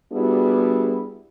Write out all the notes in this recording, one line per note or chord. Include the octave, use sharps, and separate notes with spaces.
G3 B3 D4 E4 F#4 G#4